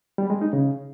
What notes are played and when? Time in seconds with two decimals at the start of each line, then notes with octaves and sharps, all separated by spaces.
0.18 G3
0.30 G#3
0.41 D#4
0.53 C#3